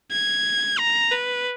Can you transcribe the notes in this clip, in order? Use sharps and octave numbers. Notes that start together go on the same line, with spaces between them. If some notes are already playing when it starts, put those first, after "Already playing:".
G#6
A#5
B4